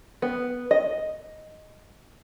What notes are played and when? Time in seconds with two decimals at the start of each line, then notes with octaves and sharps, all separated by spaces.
0.22 B3
0.71 D#5